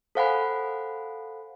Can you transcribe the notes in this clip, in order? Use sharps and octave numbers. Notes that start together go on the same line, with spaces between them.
A4 C5 F5 F#5 G#5 B5